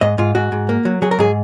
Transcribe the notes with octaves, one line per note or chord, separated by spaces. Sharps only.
G#2 D#5
G#2 F4
G#2 F#4
G#2
A#3
F#3
F#3 G#4
A#4
G#2 G#4